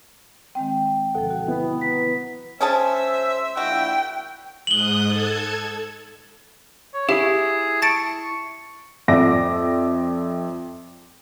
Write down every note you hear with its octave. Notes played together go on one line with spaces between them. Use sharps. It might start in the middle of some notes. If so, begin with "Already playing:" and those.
D#3 G#3 C4 G5
D2 B2 D3 F3 A4 F#5
F#4
B3 E4
A#5 B6
C#4 G#4 C5 E5 A5
A#1 A#2 E4 F#4 G5
G#2 D#6 F#6 F#7 G7
A4 A5 G#6
C#5
E4 G4 G#4
A5 C#6 A6 D7
F2 D5 E5 D6 A#6